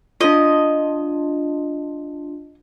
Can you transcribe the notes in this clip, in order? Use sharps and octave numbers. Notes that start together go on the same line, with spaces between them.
D4 F4 D#5